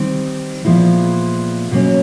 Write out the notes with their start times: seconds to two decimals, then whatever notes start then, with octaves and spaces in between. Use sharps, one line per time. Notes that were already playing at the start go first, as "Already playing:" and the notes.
Already playing: D#3 G3 C4 D#4
0.65 A#2 F3 G#3 B3 E4
1.71 B2 F#3 A#3 C#4